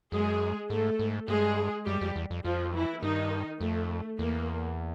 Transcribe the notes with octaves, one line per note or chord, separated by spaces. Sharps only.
F#2 G#3 G#4
G#2 A3 A4
G#2
G2 G#3 G#4
F#2 G3 G4
F2
E2
F2
F2 F3 F4
E3 E4
G2 D#3 D#4
F2 A3
E2 A#3